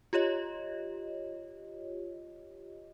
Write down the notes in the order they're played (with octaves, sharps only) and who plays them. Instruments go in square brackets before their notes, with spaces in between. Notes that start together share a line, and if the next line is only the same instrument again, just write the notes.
[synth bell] F4 G4 C#5 D#5